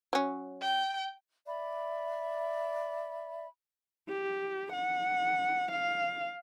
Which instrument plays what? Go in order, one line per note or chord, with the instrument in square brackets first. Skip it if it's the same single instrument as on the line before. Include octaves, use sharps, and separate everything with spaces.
[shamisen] F#3 C#4
[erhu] G5
[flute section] D5 E5 B5
[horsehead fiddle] G4
F#5
F5